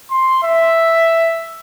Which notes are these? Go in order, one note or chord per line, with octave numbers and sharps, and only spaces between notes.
C6
E5